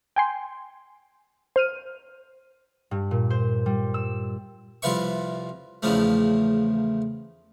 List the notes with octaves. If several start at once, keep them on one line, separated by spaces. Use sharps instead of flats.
G5 G#5 C6
C5 F6 D#7
G2
A#2
C5
G3
E6
C2 F2 F4 B4 E5 C#6
E2 A2 C#3 F3 A3